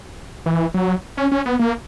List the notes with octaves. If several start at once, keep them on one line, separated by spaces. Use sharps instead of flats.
E3
F#3
C#4
C#4
B3
A#3